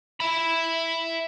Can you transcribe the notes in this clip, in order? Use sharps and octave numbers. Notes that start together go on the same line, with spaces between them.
E5 B5